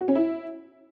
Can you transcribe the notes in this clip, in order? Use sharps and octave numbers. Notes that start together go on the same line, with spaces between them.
F#4
C#4
E4